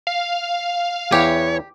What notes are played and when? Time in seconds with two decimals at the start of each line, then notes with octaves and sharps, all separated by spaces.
0.07 F5
1.12 E2 E3 B3 G4 C#5